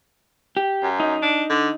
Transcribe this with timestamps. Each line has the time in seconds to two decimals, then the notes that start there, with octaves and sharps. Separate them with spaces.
0.57 G4
0.82 F#2
1.00 D#4
1.22 D4
1.49 D3